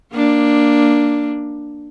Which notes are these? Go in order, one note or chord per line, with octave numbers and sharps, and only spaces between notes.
A#3 D4